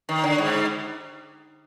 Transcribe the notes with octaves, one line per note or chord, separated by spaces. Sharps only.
D#3
D3
G#2